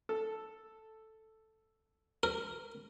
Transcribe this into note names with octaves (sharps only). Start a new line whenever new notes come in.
A4
A#4